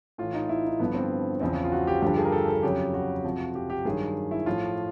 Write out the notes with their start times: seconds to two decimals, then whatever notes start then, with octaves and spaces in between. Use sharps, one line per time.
0.18 A2 E3 F4
0.34 D#4
0.49 E4
0.65 D#4
0.79 G2 D3 F3 B3
0.95 C4
1.40 E2 C#3 F3 C4
1.64 F4
1.72 F#4
1.87 G4
2.02 G2 D3 F3 G4
2.18 G#4
2.25 A#4
2.32 A4
2.48 A4
2.63 F2 C#3 F#3 G4
2.94 F#4
3.24 F2 C3 F3
3.55 G4
3.70 G4
3.85 G2 D#3 F#3 G#4
4.31 E4
4.46 A2 F3 F4